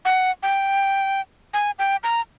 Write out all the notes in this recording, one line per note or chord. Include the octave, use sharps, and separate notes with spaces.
F#5
G5
G#5
G5
A#5